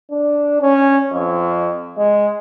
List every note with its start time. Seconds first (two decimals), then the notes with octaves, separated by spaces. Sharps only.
0.12 D4
0.62 C#4
1.13 F2
1.97 G#3